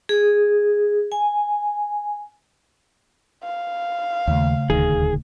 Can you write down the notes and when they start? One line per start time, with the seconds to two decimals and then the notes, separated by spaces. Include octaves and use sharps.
0.09 G#4
1.12 G#5
3.44 F5
4.28 D#2 C#3 A3
4.70 D#1 D2 D#3 G#4